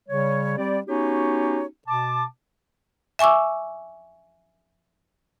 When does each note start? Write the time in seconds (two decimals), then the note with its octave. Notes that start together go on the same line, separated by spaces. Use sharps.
0.09 C#3 G3 C#5
0.58 G3 C4 G4 D5
0.87 B3 C#4 D#4 F#4 G4 C#5
1.88 B2 A5 D6
3.19 E5 G#5 C#6 D6 E6